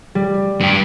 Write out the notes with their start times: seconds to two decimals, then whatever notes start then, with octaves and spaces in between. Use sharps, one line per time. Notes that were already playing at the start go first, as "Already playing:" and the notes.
0.15 G3
0.60 G2 G4